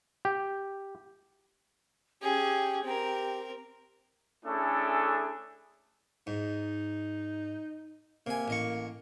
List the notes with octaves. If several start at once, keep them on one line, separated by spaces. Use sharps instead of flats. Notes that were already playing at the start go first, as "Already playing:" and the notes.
G4
C#4 G4 G#4
C4 G4 A#4
A3 C#4 D4 E4 G#4 A4
G#2 D#4
C3 A#3 G#5
A1 D#5 C#6